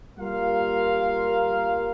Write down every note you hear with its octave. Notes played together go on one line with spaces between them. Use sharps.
G3 A#3 F4 A#4 F5